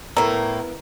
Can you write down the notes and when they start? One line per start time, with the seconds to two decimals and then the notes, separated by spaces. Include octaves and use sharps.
0.17 A2 A#3 B3 E4 A#4 A#5